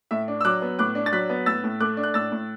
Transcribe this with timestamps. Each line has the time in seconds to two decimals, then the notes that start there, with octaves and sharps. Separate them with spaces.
0.11 A2 E5
0.28 D4
0.41 E6
0.45 F#3 D6 F#6
0.62 B3
0.79 A2 D6 F#6
0.95 D4
1.06 A6
1.12 F#3 F#6 B6
1.30 B3
1.46 A2 E6 A6
1.64 A2
1.80 A3 D6 F#6
1.97 D4
2.03 F#6
2.14 A2 E6 A6
2.32 A2